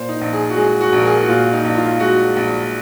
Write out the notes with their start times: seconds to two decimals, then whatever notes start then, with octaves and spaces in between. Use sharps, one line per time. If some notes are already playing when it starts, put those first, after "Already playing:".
Already playing: A#2 C5
0.09 D#4
0.21 A#1
0.33 G#4
0.50 F#4
0.56 G#3 G#4
0.81 F#4
0.92 A#1
1.00 A#4
1.05 G#4
1.23 F#4
1.28 A#2 F4
1.53 D#4
1.64 A#1
1.76 F4
2.00 G#3 F#4
2.36 A#1